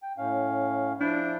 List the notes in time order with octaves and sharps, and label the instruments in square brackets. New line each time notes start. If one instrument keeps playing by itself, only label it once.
[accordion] G5
A2 C#4 F5
[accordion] F3 E4 G6 [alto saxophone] D4